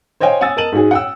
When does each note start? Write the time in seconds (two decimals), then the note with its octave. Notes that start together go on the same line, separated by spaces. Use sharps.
0.20 C5 C#5 D#5 F5 G5 G#5
0.41 F#5 G#5 D#6 E6 A6
0.57 A#4 D#5 A5 D#7 F#7
0.72 G#2 G#3 F#4 G#4
0.91 F#5 G5 E6